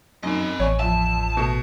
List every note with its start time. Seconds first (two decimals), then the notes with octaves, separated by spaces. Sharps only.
0.23 F#2 C4 D#4 D#5
0.60 A1 C#5 G#5
0.79 F2 E5 A5
1.37 B2 A3